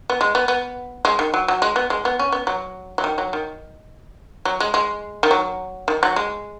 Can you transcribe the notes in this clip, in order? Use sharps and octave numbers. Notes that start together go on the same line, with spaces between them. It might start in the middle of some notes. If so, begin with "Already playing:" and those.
B3
G#3
B3
B3
G#3
D#3
F#3
F#3
G#3
B3
G#3
B3
C#4
B3
F#3
F#3
D#3
F#3
D#3
F#3
G#3
G#3
D#3
F#3
D#3
F#3
G#3